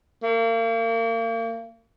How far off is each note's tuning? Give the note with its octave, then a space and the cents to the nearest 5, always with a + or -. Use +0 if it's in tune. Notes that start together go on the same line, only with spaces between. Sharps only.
A#3 -35